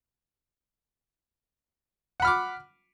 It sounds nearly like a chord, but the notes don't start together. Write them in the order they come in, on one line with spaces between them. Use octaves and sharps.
F#5 B5 F6 D6